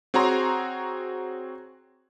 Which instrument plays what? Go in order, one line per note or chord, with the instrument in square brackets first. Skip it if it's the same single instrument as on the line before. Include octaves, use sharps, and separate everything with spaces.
[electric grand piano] C4 F#4 G#4 C#5 A#5 C6